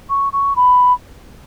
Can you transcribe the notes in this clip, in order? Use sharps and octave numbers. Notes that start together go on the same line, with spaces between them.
C#6
C#6
B5